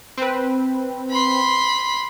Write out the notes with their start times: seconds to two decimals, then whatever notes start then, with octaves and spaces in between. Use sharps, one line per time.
0.17 C4 B4
1.11 B5 C6